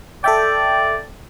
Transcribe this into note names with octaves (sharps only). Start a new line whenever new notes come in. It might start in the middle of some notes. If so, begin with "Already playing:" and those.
A4 D5 E5 G5